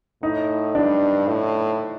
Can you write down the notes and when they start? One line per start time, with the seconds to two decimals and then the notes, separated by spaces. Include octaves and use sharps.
0.22 A2 D#4
0.75 G2 D4
1.28 A2